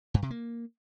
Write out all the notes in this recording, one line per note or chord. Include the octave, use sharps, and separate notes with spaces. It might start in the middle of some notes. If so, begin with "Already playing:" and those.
G2
C3
A#3